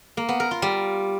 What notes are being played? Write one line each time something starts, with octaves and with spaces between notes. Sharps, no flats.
A#3
B3
A#4
F4
G3